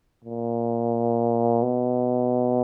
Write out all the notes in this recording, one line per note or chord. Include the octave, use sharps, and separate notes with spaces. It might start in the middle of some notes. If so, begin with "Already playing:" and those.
A#2
B2